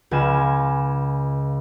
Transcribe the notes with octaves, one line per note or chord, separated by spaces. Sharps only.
C#2 F4 B4 G#5 E7